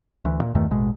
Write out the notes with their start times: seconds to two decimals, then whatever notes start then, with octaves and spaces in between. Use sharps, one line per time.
0.25 D2 E3
0.42 A#2
0.55 E2 G2 D#3 A3
0.71 A1 B2 G#3